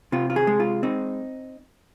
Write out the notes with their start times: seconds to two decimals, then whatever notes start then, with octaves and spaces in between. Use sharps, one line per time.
0.12 C3 F4
0.30 F4
0.36 G#4
0.47 G#3
0.60 F4
0.83 C4 D#4